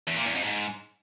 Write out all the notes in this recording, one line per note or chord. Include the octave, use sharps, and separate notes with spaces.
E2
A#2
E2
F2
G#2